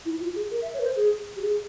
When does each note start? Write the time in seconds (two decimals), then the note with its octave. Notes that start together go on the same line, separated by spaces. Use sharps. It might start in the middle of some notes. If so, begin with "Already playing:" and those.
0.05 E4
0.21 F4
0.35 G#4
0.51 A#4
0.62 E5
0.74 C#5
0.79 A#4
0.85 C5
0.96 G#4
1.36 G4
1.41 G#4